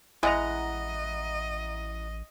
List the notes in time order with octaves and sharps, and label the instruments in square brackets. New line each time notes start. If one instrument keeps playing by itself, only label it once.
[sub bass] A1 [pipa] G#3 [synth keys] E4 F#5 A#5 [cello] D#5